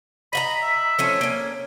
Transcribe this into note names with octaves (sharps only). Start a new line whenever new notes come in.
D#5 F5 A#5 B5
E5
F3 A3 C#4
A#3 C#4